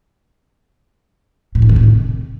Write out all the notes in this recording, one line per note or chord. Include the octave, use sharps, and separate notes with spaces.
A2
G2
D#3
A2
C3